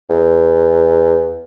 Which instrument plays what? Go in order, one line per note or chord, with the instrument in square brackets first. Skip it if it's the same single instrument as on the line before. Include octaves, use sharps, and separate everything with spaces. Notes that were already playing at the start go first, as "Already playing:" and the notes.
[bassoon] E2